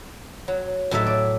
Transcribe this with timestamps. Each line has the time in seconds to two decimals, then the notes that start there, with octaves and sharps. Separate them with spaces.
0.48 F#3
0.91 A2 F#3 D#4 F#4 A4 E5
1.07 D5